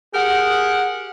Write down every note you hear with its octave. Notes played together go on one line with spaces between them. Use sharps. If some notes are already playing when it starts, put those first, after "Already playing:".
G4 G#4 A#4 F#5